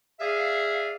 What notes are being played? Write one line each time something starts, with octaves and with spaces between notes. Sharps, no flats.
G#4 D5 E5 F5